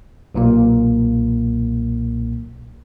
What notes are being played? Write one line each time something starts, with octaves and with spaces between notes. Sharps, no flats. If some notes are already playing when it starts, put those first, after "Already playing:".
B1 A#2 A#3